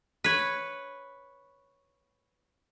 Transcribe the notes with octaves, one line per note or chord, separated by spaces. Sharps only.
B4 C#5